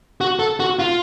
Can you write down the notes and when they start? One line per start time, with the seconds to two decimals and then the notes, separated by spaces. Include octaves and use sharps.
0.21 F#4
0.39 A4
0.60 F#4
0.79 F4